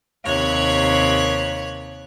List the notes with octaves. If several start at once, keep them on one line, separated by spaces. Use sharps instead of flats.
D#2 C3 C#5 F#6 G#6